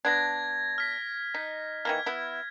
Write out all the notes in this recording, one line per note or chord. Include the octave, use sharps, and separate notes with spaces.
B3 D4 G#6 A#6
F6 B6
D#4 B6
D#3 E3 A#3 F6 G#6
B3 E4